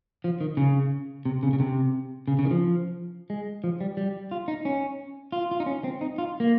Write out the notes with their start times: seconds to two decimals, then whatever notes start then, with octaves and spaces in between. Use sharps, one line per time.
0.24 F3
0.41 D#3
0.57 C#3
1.25 C3
1.43 C#3
1.53 C#3
1.60 C3
2.28 C#3
2.39 C#3
2.45 D#3
2.51 F3
3.30 G#3
3.64 F3
3.81 G3
3.97 G3
4.31 F4
4.48 D#4
4.65 C#4
5.32 F4
5.51 F4
5.60 D#4
5.66 C#4
5.84 C4
6.01 D#4
6.18 F4
6.40 A#3